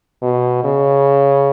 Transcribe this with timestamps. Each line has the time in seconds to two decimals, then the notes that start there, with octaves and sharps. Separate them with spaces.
0.22 B2
0.64 C#3